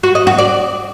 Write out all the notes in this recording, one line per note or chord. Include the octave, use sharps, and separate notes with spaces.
F#4
D#5
F#4
D5